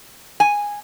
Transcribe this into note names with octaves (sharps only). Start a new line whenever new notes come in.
G#5